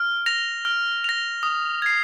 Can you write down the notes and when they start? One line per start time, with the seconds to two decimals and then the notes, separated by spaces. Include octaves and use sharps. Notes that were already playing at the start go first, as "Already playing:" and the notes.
Already playing: F6
0.26 A#6 F7
0.65 F6
1.04 A#6 F7
1.43 D#6
1.82 G#6 C7